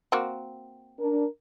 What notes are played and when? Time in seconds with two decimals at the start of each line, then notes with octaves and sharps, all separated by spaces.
0.12 A#3 C4 F#4
0.99 D4 A#4